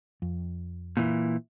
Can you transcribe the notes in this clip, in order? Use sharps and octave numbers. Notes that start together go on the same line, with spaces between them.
F2
A#2 E3